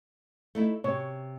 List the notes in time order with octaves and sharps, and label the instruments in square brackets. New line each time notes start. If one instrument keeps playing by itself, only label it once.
[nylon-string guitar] A3 D#4 E4
[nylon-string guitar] C3 [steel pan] C#5